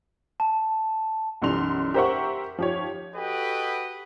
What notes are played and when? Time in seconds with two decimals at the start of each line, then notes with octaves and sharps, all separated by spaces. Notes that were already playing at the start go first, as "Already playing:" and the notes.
0.40 A5
1.42 B1 F#2 E3 G3 C6 F7
1.94 G4 A#4 C5 E5 F#5 C#6
2.59 F3 G4 C#5
3.15 F#4 G4 A4 B4 D#5 G5